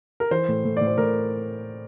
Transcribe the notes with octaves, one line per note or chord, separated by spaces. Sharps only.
A#4
E3 C5
A2
A2
A2 D5
C5
A2 A#4